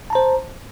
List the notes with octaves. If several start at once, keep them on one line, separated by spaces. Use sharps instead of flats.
C5 A5 A#5